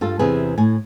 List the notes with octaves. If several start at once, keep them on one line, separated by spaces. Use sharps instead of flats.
G2 F4 A4
E2 C3 G#4 B4
A2 G#5